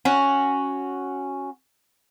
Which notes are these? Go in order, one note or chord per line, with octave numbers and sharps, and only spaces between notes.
C#4 F#4